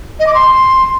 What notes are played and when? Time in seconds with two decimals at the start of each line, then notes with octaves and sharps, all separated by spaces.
0.19 D#5
0.26 D6
0.34 C6